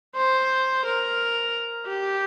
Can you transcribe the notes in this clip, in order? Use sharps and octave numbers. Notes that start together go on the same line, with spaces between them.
C5
A#4
G4